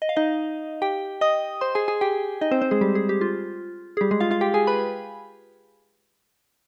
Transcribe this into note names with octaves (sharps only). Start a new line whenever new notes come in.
D#5
F5
D#4 D#5
G4 G5
D#5 D#6
C5 C6
G#4 G#5
G#4 G#5
G4 G5
D#4 D#5
C4 C5
C4 C5
G#3 G#4
G3 G4
G#4
G4
F4
G#4
G3 G4
G#3 G#4
F4 F5
F4 F5
G4 G5
G#4 G#5
B4 B5